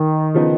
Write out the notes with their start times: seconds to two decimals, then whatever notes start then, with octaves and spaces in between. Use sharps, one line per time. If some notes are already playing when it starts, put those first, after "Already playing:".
Already playing: D#3
0.34 C#3 F3 B3 D#4